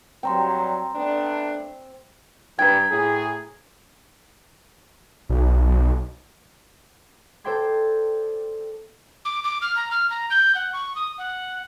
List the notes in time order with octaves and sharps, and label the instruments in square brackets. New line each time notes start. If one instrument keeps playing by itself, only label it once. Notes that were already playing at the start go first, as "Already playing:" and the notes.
[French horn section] G2 F#3 [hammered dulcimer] C4 [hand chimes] G5 A#5 C6
[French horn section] A3 B3 D4
[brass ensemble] G2 [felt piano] B4 G5 [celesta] A#5 G#6
[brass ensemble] A2 G#4
[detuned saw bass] B1
[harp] A4 C5 D5 G5 C6 G#6
[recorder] D6
D6
F6
A#5
F6
A#5
G6
F#5
C#6
D#6
F#5